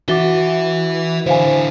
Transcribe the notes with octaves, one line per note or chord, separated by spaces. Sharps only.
E3 F#4 B4 E5 D6 A6 G7
D3 E4 C5 F5 G#5